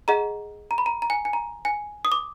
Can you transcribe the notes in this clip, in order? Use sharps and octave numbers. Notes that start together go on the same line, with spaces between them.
G#4 D#5 F#5 A#5
A#5
B5
A#5
A#5
G#5
G#5
A#5
G#5
D#6
D6